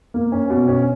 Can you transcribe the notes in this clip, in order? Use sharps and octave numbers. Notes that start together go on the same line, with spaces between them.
A#3
C#4
B2
C#4